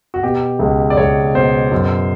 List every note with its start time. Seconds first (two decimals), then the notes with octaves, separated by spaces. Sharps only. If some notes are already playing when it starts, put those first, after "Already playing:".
0.14 F#4
0.23 B2 G4
0.59 C#2
0.90 D5
0.97 C#2 C#5
1.35 B2 C5
1.72 F#2